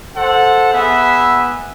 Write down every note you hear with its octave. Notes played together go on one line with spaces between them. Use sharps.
A4 C5 F#5
B3 G#4 E5